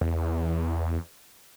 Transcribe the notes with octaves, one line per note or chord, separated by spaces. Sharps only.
E2